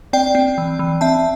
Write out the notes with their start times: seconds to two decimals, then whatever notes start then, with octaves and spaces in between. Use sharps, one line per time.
0.13 C4 D5 G5
0.35 C4
0.58 E3
0.79 E3
1.01 C4 E5 A5